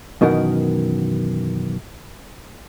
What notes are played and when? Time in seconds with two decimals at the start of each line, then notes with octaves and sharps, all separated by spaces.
0.21 F#2 B2 D#3 E3 A#4 F#5